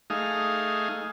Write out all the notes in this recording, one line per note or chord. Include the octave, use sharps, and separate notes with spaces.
A3 D#4 G#4 F5